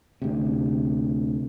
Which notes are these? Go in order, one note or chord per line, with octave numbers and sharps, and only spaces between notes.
D2 C3